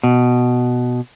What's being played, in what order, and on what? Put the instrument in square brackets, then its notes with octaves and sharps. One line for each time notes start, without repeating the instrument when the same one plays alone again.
[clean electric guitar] B2